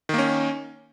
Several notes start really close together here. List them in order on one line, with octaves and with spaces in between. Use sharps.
D#3 A#3 C#4